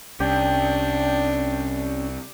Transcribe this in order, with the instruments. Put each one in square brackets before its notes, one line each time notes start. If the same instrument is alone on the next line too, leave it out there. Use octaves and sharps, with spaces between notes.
[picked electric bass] C2 [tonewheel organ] C#4 [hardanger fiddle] D4 [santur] G4